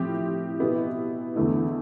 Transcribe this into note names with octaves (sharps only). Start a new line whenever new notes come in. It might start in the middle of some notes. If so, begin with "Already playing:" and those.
Already playing: A2 F3 C4 E4 G4
B2 B3 E4 G4
E2 D3 A3 E4